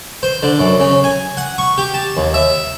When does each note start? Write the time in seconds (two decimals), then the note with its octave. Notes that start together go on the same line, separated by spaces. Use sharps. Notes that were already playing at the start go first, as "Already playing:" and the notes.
0.23 C5
0.43 D3
0.59 F#2
0.80 C#3
1.04 G#5
1.37 F#5
1.58 C#6
1.78 G4
1.94 A5
2.17 D#2
2.34 E5